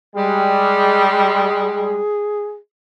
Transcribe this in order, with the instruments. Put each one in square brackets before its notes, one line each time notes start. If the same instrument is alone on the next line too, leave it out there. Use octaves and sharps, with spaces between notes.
[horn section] G3 G#3 [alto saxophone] G#4